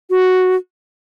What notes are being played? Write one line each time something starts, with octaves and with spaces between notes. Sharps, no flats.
F#4